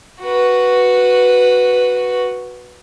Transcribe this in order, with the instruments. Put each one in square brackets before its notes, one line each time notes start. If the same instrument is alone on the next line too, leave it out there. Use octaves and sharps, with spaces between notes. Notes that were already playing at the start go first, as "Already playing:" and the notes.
[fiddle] F#4 B4